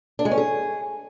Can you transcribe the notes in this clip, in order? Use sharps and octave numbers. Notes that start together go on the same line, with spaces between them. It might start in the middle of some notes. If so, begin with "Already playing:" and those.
D4
G#3
C#4
G#4